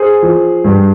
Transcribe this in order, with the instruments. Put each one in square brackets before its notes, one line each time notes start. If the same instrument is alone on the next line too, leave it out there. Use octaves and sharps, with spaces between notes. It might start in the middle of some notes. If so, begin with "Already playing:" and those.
Already playing: [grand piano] G#4 C5
F3
G2